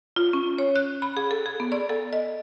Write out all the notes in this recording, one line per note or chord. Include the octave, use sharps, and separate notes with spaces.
F4
C#4
C#5
F#6
B5
G#4
A4
G#4
B3
D5
A4
D#5